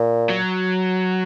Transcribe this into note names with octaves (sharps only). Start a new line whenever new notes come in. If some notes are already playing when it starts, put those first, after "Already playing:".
Already playing: A#2
F#3